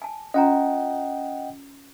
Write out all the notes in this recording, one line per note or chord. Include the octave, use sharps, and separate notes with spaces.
G#5 A5
C#4 F4 D#5 F#5 G5 A#5